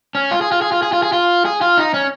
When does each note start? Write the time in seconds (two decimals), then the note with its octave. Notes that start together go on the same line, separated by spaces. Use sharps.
0.15 C#4
0.31 F4
0.41 G#4
0.52 F4
0.62 G#4
0.72 F4
0.82 G#4
0.93 F4
1.03 G#4
1.13 F4
1.45 G#4
1.61 F4
1.78 D#4
1.94 C#4